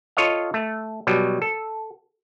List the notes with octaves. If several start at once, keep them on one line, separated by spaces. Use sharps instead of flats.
F4 A4 C#5 D#5 F5
A3
B2 F#3 G3
A4